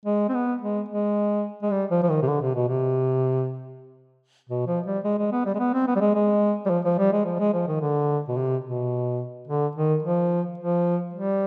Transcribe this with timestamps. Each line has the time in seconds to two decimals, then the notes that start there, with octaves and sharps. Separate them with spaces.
0.05 G#3
0.29 C4
0.34 B3
0.61 G#3
0.89 G#3
1.63 G#3
1.71 G3
1.91 F3
2.03 F3
2.09 D#3
2.22 C3
2.28 D3
2.42 C3
2.55 B2
2.68 C3
4.49 B2
4.67 F3
4.86 G3
5.04 G#3
5.18 G#3
5.32 B3
5.46 G3
5.54 G#3
5.59 B3
5.74 C4
5.87 B3
5.96 G3
6.01 G#3
6.15 G#3
6.66 G3
6.70 F3
6.85 F3
6.98 G3
7.12 G#3
7.25 F3
7.39 G#3
7.53 F3
7.67 D#3
7.81 D3
8.28 B2
8.37 C3
8.64 B2
9.47 D3
9.75 D#3
10.03 F3
10.58 F3
11.13 G3